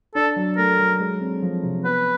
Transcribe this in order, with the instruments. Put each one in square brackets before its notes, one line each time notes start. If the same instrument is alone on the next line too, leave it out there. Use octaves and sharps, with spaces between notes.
[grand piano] D4 [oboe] A4
[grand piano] F#3
[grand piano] A3 [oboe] A#4
[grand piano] F#3
G#3
C4
F3
C3
[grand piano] B3 [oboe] B4